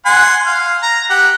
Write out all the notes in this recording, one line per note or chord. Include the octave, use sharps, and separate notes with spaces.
F#5 G#5 C6
F5
A#5
G4 F#5